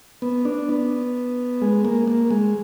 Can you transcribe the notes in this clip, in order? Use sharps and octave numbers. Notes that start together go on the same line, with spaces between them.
B3
D4
B3
G#3
A#3
A#3
G#3